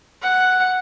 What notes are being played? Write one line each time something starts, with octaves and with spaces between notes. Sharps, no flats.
F#5